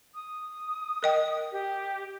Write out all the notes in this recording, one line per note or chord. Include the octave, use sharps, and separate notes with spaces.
D#6
A#4 D#5 G5
G4